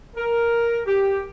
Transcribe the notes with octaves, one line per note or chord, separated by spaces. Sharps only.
A#4
G4